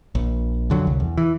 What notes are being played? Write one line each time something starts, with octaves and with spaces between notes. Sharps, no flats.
A#1
F2 D3 F#3
C2
E2
E3